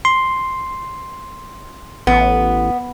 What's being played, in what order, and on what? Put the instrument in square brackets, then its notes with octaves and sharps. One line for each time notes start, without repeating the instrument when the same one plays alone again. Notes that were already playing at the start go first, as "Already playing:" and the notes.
[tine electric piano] C6
[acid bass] A1 [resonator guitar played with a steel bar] B3